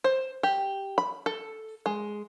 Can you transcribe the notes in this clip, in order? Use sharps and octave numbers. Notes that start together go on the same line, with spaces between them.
C5
G4
B5
A4
G#3